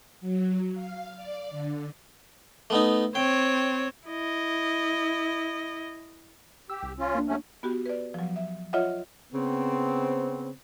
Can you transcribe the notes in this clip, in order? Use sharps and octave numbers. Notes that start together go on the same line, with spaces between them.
F#3
F5
D5
D3
A3 B3 D#4
C4 C#5 G5
E4 D#5
G4 E6
C2
C#4 F4
A#3 D4
F#3 A3 C#4
B3 F#4 G4
B4 D5
F3 F#3
E5
F4 C#5 D#5 E5 F#5
C#3 B3 C4